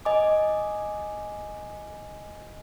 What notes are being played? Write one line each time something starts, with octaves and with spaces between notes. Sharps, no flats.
D#5 G#5 D6